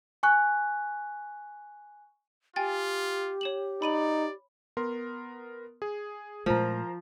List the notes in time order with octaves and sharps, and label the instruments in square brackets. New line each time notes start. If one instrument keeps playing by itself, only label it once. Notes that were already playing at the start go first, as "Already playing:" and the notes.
[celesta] G#5 C#6 F#6
[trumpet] F4 [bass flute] G4 [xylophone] G5 G#5 A6
[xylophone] C#5 E7 F#7
[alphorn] D#4 [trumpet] D5 [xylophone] B5 D#7 F#7
[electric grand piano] B3 A#4 C6
G#4
[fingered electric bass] A#2 G#3 A3 [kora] F3 [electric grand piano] A#4 C5 A#5